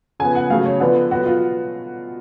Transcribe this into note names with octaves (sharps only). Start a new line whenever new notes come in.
C#3 F3 B3 G#5
F#5
C#3 F#3 A3 F5
C#5
D3 F3 B3 B4
B2 F#3 B3 F#4
F4